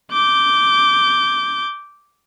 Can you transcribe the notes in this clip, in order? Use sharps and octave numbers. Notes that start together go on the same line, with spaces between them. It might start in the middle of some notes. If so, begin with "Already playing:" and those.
D6 G6